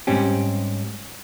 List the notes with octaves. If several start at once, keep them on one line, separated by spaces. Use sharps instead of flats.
G#2 G3 C4 C#4 G4